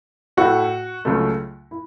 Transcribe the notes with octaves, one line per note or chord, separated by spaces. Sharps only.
A2 A3 E4 F#4
C#2 C#3 F#3 A3
E4